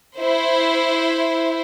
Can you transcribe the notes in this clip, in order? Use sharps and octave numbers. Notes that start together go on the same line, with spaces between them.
E4 C5